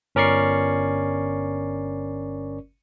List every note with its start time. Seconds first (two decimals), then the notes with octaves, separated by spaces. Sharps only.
0.15 G1 C#4 A#4 D5 C#6 C7